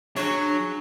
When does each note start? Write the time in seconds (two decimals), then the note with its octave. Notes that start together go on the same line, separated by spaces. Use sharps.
0.17 F#3 D4 G#4 C#5